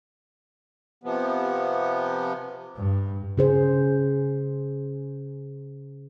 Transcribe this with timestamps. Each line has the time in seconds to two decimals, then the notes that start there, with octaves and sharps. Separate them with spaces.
1.04 C3 F3 B3
2.76 G2
3.38 C#3 G#4 C5